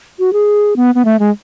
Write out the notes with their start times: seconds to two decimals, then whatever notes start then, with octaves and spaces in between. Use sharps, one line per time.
0.19 F#4
0.33 G#4
0.76 B3
0.95 B3
1.05 A3
1.19 G#3